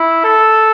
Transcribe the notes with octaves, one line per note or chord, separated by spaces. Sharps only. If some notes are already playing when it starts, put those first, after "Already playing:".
Already playing: E4
A4